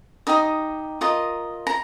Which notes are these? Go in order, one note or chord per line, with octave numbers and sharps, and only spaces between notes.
D#4 G4 D#5 D#6
F4 A#4 D#5 D#6
A#5